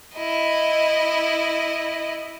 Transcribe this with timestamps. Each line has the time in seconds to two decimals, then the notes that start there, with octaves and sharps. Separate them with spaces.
0.16 E4 D#5